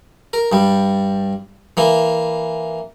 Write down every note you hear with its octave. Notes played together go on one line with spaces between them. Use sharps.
A#4
G2 G3
E3 A#3